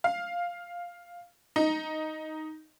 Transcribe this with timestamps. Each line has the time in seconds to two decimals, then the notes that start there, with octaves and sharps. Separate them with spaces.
0.04 F5
1.56 D#4